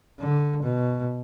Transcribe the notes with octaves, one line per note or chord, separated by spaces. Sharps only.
D3
B2